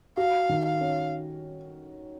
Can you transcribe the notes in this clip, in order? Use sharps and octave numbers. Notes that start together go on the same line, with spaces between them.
F#4 F5
D#3
F5
C#4